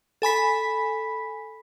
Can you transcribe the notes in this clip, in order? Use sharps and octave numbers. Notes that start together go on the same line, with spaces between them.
A4 G#5 B5 B6